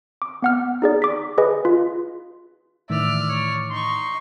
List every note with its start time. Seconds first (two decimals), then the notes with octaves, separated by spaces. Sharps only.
0.22 D6
0.42 B3 F#5 F6
0.82 D#4 G#4 D5
1.02 D6 B6
1.38 G#4 B4 D#5 G#5
1.65 F4
2.90 A2 D#3 E3 D5 E5 F6
3.29 C#5
3.70 D#4 C6 C#6